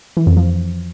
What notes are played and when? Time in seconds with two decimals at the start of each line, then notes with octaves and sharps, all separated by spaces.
0.17 E3
0.27 F2
0.37 F3